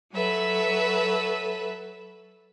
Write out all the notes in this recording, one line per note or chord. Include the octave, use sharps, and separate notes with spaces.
F#3 A4 B4 E5